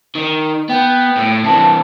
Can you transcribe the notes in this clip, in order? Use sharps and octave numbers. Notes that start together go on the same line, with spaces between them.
D#3
B3 G5
A2
C3 E3 A5